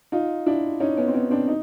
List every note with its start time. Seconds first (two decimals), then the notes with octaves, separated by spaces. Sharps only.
0.12 D#4 F4
0.46 D4 E4
0.80 C#4 D#4
0.97 B3 C#4
1.08 C4
1.14 B3 C#4
1.31 C4 D4
1.48 D#4